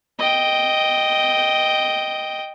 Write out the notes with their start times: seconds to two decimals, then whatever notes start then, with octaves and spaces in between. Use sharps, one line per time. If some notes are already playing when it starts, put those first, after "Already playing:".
0.19 D#5 G5